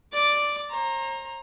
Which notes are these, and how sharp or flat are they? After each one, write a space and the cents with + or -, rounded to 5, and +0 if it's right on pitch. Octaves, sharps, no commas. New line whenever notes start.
D5 +0 D6 +0
C5 +40 A#5 +0